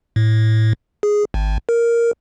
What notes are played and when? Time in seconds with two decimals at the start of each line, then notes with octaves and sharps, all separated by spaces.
0.16 A2
1.03 G#4
1.34 G#1
1.69 A#4